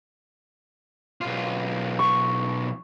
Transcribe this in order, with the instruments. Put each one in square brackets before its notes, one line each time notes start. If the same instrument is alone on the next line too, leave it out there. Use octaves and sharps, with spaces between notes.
[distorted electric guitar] B1 F4
[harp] C#6